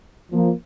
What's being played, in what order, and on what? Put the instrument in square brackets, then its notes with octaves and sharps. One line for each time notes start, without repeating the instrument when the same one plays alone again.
[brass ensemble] F3 A#3